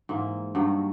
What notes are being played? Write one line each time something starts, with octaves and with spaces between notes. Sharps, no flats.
G#2 E3 A#3
G2 D#3 F#3 A#3